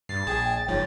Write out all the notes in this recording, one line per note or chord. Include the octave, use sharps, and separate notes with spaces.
G2 A6 C7
A#1 G#4 G5 A5
F#1 G#2 F3 C#5